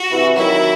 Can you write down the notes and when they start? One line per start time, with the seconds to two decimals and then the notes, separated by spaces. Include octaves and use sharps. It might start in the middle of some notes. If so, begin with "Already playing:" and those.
Already playing: F#4
0.10 C3 E3
0.36 D#3 F#3 E4